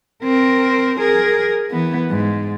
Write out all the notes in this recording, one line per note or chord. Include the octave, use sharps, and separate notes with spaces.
C4 A#4
G#4 A#4
E3 B3
G#2